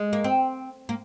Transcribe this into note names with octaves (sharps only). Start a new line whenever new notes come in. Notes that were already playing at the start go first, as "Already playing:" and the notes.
Already playing: G#3
A#3
C4
A#3